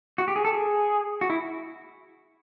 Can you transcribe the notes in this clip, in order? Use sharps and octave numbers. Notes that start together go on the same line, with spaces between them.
F#4
G4
G#4
A4
G#4
F#4
E4